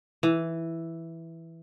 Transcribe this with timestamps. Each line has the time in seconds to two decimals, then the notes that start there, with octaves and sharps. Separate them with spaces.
0.23 E3